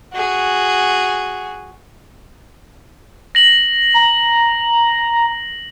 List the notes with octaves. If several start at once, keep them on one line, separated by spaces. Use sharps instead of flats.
F#4 G#4
A#6 F#7
A#5